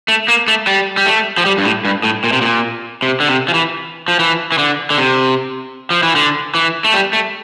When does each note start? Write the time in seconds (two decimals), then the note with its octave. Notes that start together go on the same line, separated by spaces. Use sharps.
0.08 A3
0.28 A#3
0.48 A3
0.67 G3
0.97 G3
1.06 A3
1.37 F3
1.46 G3
1.58 G2
1.65 A2
1.85 G2
2.04 A2
2.24 A#2
2.33 C3
2.41 A#2
3.02 C3
3.20 D3
3.28 C3
3.48 F3
3.54 E3
4.08 F3
4.19 E3
4.52 E3
4.58 D3
4.90 D3
4.98 C3
5.90 F3
6.03 E3
6.16 D3
6.55 E3
6.84 A3
6.94 G3
7.13 A3